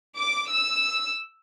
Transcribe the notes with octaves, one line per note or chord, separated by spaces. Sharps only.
D6
E6